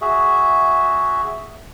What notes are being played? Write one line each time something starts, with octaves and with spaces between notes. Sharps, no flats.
F#4 G#4 E5